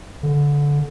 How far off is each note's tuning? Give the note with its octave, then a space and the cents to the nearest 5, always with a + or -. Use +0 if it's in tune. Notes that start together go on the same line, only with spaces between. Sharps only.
D3 -20